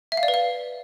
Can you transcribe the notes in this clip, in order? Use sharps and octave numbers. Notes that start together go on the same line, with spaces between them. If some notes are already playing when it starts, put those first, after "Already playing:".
E5
F5
D5
B4
F5